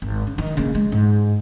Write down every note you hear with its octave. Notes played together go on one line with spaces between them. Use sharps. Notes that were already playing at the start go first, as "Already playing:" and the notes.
G#1
C#3
D#3
C#3 A#3
G#3
G#2